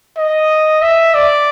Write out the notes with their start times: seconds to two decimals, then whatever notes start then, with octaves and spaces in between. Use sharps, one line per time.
0.17 D#5
0.82 E5
1.15 D5